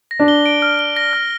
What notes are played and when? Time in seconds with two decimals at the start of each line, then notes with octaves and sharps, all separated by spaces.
0.11 A#6
0.20 D4
0.28 G7
0.46 D7
0.62 F6
0.79 G7
0.97 A#6
1.13 F6